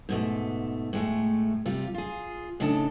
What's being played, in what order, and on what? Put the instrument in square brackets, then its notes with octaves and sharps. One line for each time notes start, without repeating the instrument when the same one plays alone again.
[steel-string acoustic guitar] G#2 B2 A3
A2 G#3 A3
C3 G3 F4
F4 G#4
A2 C#3 D4 D#4 A4 A5